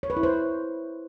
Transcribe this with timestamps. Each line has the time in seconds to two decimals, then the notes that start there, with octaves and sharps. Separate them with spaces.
0.03 C#5
0.10 B4
0.17 E4
0.23 C5